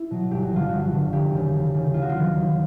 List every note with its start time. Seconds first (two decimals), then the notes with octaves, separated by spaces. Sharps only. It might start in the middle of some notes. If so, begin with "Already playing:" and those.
Already playing: E4
0.10 B2 F#3
0.31 G1 G4
0.43 F#4
0.52 G2 D3 F3 F4
0.69 G1 F#4
0.92 G2 D3 F3
1.13 F1 G4
1.33 D#2 C#3
1.53 F1
1.74 D#2 C#3
1.94 D#2 F4
2.02 F#4
2.09 F4
2.14 D#3 F#3
2.35 D#2